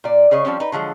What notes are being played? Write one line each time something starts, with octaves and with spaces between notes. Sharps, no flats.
A#2 D5
C#3 G#4 C#5 D#5
F3 G3 C4 C#4
D#4 B4
D3 F3 F#3 G#3